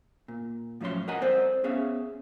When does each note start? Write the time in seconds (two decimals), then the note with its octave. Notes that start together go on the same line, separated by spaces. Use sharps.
0.28 A#2
0.81 A2 F3 F#3 C#4 C#5 C6
1.08 A#4 B4 D#5 F#5 G#5 A#5
1.21 C4 A4 C5 D5
1.64 B3 C#4 G#4 C#5 E5 F5